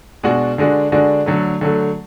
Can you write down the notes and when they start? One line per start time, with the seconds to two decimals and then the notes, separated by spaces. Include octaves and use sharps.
0.23 B2 G#3 D4 F#4
0.58 D3 G#3 D4 F#4
0.92 D3 G#3 D4 F#4
1.26 D3 F#3 A3
1.61 D3 F#3 A3